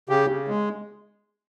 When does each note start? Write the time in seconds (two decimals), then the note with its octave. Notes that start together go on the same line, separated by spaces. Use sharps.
0.09 C#3 G4
0.29 C#3
0.48 G#3